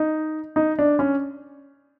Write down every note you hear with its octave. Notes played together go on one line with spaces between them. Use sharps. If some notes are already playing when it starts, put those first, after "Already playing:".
Already playing: D#4
D#4
D4
C#4